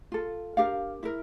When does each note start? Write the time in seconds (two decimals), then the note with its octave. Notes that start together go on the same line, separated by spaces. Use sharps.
0.12 F4 A4
0.57 D4 G4 A#4 F5
1.03 E4 A#4 E5